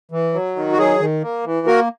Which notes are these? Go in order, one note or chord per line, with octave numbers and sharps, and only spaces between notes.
E3
F#3
D#3
F#4
F#3 G#4
D#3
A#3
E3
A#3 F#4 A#4